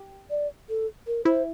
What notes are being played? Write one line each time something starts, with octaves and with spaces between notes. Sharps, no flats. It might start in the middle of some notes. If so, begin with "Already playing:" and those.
Already playing: G4
D5
A4
A#4
E4 C5